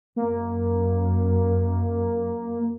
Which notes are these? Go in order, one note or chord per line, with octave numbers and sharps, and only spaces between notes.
F#2 A#3